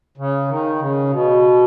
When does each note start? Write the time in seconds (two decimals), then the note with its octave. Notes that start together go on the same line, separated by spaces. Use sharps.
0.17 C#3
0.48 D#3
0.79 C#3
1.10 B2